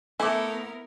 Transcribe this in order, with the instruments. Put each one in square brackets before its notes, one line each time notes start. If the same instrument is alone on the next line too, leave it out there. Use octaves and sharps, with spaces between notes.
[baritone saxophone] A3 [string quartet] B3 A#4 [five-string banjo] E4 [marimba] G#5 D6